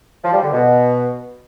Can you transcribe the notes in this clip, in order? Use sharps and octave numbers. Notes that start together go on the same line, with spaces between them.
F3
G3
D3
B2